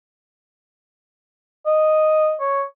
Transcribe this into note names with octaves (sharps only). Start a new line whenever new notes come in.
D#5
C#5